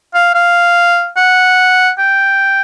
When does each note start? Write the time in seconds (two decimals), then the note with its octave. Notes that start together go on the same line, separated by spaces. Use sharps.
0.14 F5
0.34 F5
1.17 F#5
1.98 G5